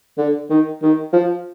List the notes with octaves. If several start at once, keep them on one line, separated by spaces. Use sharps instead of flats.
D3
D#3
D#3
F3